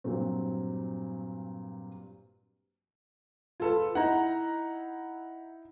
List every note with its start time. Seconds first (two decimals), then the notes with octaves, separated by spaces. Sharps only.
0.04 G2 A#2 F#3 C4
3.60 F4 A4 B4
3.95 D#4 E4 F#5 A#5